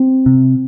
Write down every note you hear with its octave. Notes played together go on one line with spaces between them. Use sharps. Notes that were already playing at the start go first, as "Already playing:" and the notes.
Already playing: C4
C3